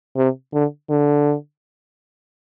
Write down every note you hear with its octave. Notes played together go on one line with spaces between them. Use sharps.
C3
D3
D3